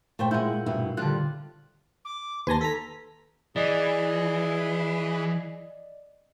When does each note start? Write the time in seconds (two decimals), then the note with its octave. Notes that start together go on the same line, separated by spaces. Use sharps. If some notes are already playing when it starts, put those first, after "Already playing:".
0.19 A#2 A3 C5 G5
0.31 G#3 E4 F#5 G6
0.66 G2 B2 E4
0.97 D3 G3 C4 F4 F#6
2.05 D6
2.47 D#2 B4 G#5 A5 C6 A#6
2.61 A4 A#5 B6
3.56 E3 G#4 D5 D#5